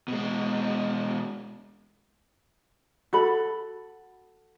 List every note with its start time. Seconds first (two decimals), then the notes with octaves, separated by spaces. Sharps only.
0.08 B2 G#3
3.13 F#4 A4 B5